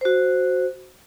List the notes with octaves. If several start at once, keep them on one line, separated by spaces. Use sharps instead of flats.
F#4 C5